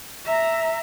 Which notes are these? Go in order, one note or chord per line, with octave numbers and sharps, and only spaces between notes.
E5 A#5